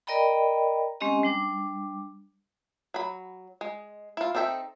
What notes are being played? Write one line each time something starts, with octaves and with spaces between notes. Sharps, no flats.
A#4 D5 D#5 G5 A#5 B5
G#3 C4 C#4 G4 D#5
G3 D4 D6
F#3 B5
G#3
E4 F4
C4 D#4 A4 E5 G5